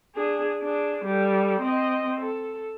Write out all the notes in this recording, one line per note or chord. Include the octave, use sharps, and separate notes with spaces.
D4 G#4
D4 G#4
G3 A4
C4 D#5
A4